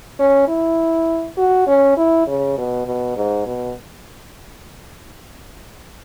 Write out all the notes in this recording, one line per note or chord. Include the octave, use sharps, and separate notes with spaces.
C#4
E4
F#4
C#4
E4
C#3
B2
B2
G#2
B2